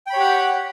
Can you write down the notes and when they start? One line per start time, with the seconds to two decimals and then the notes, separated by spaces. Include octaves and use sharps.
0.07 G5
0.10 B5
0.13 C#5
0.17 G4
0.20 F#5